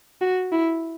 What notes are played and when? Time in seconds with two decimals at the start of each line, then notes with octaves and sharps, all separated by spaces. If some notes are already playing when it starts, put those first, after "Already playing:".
0.21 F#4
0.53 E4